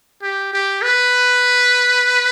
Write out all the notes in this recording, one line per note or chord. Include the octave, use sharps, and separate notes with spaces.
G4
G4
B4